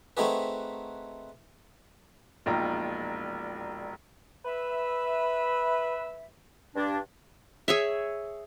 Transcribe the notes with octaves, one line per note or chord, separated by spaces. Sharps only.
A3 C4 D#4 F#4 G#4 B4
E1 A#1 D#4 F4 G5 A#5
B4 E5
G2 D4
G#4 C#5 E5